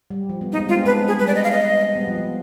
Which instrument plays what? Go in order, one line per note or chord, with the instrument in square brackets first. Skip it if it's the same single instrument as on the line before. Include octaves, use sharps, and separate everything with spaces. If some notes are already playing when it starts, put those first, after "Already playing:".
[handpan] G3
F3
G3 B3
[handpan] G#3 [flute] D#4
[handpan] G3 B3
[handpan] G#3 C4 [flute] F4
[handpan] B3 D4
[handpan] G#3 C4 [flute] B4
[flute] G#4
[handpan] G3 B3 [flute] B4
[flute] D5
D#5
F5
D#5
[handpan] G3 B3
F3
F3